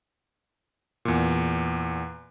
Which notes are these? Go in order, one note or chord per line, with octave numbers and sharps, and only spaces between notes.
E2 A#2